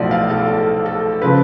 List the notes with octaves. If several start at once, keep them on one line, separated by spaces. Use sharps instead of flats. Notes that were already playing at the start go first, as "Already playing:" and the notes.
Already playing: B1 A2 F3 D5
F5
A4
A4
A4
C#3 F3 B4